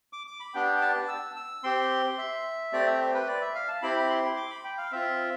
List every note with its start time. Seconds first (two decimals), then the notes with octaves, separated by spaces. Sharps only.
0.13 D6
0.27 D6
0.40 B5
0.54 B3 D4 G4 G5
0.81 A5
1.08 E6
1.36 E6
1.64 C4 G4 C6
2.18 E5
2.72 A3 C4 G4 D5
2.87 E5
3.00 C5
3.14 B4
3.28 D5
3.41 E5
3.55 F5
3.68 A5
3.82 C4 E4 G4 B5
3.99 B5
4.10 C6
4.37 D6
4.50 B5
4.64 G5
4.78 F5
4.92 C4 F4 E5